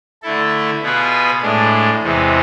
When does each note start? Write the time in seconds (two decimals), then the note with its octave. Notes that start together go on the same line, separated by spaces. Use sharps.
0.22 D3 A3 E4 A4
0.82 B2 B3 F4 G#4 B4
1.42 A2 G#3 D4
2.02 E2 C3 E3 G#3